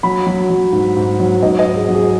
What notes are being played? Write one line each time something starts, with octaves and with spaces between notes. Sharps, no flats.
F#3 B5
F#3
F#3
G#2
G#2
F#3
G#2 D#5
D#5
G#2
G#4
F#3
G#4